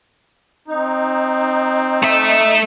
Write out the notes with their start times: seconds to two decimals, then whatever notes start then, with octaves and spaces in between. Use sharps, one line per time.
0.68 C4 D#4
2.03 A3 E5